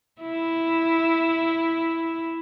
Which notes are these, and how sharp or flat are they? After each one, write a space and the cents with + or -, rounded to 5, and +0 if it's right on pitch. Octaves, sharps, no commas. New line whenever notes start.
E4 +0